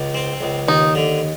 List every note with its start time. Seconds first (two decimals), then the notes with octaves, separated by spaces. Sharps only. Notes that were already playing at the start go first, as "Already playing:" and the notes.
Already playing: C#2
0.14 C4
0.41 C#2
0.68 D#2 D#4
0.95 D3